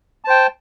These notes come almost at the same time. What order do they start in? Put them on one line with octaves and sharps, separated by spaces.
A5 C5 G5